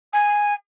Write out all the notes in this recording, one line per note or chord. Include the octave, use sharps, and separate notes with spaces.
G#5